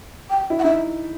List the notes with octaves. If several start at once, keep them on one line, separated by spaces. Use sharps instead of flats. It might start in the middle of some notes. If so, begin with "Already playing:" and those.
G5
E4
F#5
D#4 E5